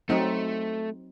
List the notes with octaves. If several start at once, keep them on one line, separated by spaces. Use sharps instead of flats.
F#3 A3 C4 D#4